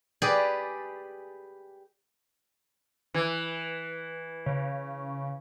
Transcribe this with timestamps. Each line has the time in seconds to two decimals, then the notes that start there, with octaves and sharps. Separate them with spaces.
0.22 G4 G#4 B4 D5
3.14 E3
4.46 C#3